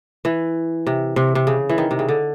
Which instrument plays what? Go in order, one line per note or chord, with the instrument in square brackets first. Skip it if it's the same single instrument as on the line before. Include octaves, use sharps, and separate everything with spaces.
[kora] E3
C3
C3
C3
C#3
E3
D#3
C3
C#3
D3